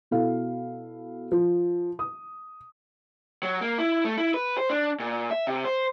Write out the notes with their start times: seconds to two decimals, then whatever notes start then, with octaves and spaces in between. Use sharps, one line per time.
0.11 B2 E4 A4 F5
1.32 F3
1.99 D#6
3.43 F#3
3.61 A#3
3.78 E4
4.05 A3
4.17 E4
4.34 B4
4.58 C5
4.70 D4
5.00 A#2
5.31 E5
5.47 C3
5.65 C5